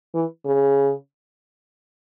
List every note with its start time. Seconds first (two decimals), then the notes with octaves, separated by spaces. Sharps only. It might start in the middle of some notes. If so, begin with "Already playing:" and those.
0.15 E3
0.45 C#3